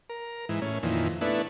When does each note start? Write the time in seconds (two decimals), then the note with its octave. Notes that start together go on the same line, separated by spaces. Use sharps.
0.10 A#4
0.49 G#2 E3
0.62 A2 C#4
0.83 F2 A#2 D#3 E3
1.21 A3 B3 D4 E4